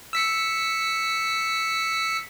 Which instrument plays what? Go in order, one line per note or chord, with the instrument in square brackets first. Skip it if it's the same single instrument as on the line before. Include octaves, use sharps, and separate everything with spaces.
[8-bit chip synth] E6 B6 C#7